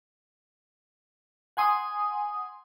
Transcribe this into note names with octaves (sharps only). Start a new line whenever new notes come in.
F#5 G#5 C6 D#6